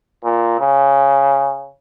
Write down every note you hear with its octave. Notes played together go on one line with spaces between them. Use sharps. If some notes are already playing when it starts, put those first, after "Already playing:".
A#2
C#3